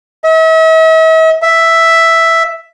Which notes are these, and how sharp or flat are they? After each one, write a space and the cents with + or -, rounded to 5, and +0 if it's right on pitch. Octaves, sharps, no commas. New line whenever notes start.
E5 -45
E5 +0